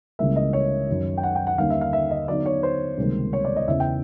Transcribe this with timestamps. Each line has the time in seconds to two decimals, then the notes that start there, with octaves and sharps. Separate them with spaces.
0.19 C#2 C#3 E3 G3 A#3 E5
0.36 D#5
0.53 C#5
0.89 F#2 D#3 F#3
1.17 G5
1.23 F#5
1.35 G5
1.47 F#5
1.58 D#2 D3 G3 A#3 C#4 F5
1.70 E5
1.81 F5
1.93 E5
2.11 D#5
2.28 D3 F#3 B3 D#4 D5
2.46 C#5
2.63 C5
2.98 C#2 C3 D#3 G3 A#3
3.33 C#5
3.45 D5
3.56 D#5
3.68 E2 C#3 E3 E5
3.80 G5